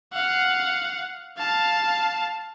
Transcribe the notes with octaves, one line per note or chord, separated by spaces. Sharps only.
F5 F#5
F5 A5